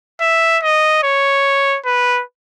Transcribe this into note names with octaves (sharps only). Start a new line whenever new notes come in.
E5
D#5
C#5
B4